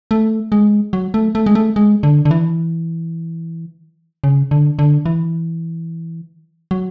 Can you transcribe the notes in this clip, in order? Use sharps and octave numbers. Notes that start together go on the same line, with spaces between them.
A3
G#3
F#3
A3
A3
G#3
A3
G#3
D3
D3
E3
C#3
D3
D3
E3
F#3